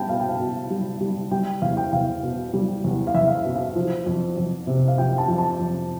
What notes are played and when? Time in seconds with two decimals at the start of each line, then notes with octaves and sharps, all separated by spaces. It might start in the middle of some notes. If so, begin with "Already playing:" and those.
Already playing: G3 G5 A5 B5
0.09 B2 F5
0.20 G5
0.29 F5
0.40 B2
0.70 G3
1.01 G3
1.31 G3 G5
1.62 E2 F5
1.77 G5
1.92 E2 F5
2.23 B2
2.53 G3
2.84 E2
3.07 F5
3.14 E2 E5
3.28 F5
3.35 E5
3.45 B2
3.55 F5
3.76 F3
4.06 F2
4.37 F2
4.67 C3
4.88 F5
4.98 F3 G5
5.18 A5
5.28 F2
5.38 A5
5.59 F2